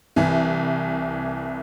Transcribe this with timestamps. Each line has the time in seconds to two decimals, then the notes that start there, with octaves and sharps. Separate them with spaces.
0.16 C2 E3